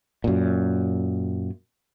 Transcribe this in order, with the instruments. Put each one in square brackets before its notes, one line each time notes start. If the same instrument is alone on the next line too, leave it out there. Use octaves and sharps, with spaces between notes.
[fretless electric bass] F#2 A#2